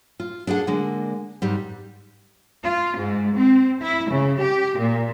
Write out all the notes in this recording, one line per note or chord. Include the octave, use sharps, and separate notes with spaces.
F4
D4 G#4 A4 F#5
D3 G#3 A#3
G#2 G3 C4
F4
G#2
C4
E4
C#3
G4
A#2